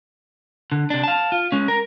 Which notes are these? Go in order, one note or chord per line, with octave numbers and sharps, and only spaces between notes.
D3
C3 D4
F5 A5
F4
G#3 C#4
A#4